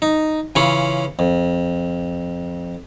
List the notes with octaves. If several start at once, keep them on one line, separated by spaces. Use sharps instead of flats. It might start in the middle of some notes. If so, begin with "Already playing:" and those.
D#4
C#3 E3 C#4 F4 B5 C#6
F2